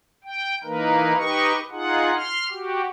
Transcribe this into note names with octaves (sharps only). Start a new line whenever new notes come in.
G5
E3 A#3 D#4 A#4 B4
D#4 G4 B4 D#5 C#6
D#4 F4 G#4 F#5
C6 F6
F#4 G4